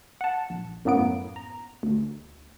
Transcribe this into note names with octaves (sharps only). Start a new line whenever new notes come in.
F#5 A5
A#1
F#2 A2 A#3 B3 D7
A#5
D2